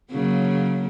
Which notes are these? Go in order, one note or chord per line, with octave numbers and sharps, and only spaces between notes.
C#3 F#3 A#3